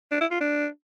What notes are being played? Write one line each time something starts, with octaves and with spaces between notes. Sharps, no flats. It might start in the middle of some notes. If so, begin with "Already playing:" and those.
D4
E4
F4
D4